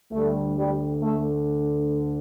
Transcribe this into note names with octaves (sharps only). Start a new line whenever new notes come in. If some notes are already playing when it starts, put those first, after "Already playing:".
D2 D3 G3 A3
G3
A3